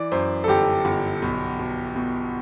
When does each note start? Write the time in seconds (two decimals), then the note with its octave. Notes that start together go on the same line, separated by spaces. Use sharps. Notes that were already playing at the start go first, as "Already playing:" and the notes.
Already playing: E3 D5
0.12 F#2 C5
0.44 A4
0.48 G1 G4
0.85 G1
1.22 B1
1.59 B2
1.96 B2